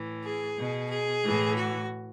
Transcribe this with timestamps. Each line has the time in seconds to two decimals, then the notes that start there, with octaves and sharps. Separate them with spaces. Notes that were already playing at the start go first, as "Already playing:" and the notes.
Already playing: A2 E3
0.24 G#4
0.57 B2
0.90 G#4
1.23 A2 E3
1.56 F#4